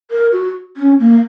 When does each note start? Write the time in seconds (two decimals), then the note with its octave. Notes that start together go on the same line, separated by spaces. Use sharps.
0.11 A#4
0.32 F#4
0.77 C#4
0.99 A#3